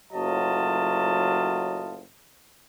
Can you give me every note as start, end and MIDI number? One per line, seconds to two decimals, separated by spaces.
0.13 2.03 30
0.13 2.03 45
0.13 2.03 54
0.13 2.03 65
0.13 2.03 75
0.13 2.03 81